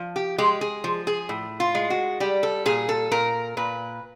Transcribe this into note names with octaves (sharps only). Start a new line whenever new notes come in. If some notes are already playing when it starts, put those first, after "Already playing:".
Already playing: F3
G4
G#3 G4
G#4
F3
G#4
A2
F4
G#3
F#4
G3 G4
A4
A#2 G#4
A4
A#2 A#4
A#2 B4